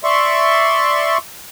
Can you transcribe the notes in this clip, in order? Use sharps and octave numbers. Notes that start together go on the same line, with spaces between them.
D5 E5 C6 C#6